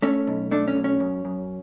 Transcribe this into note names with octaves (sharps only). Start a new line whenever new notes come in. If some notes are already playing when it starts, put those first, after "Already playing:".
A3 C#4
B1
A3 D4
C#4
B1
C#4
F#2
F#2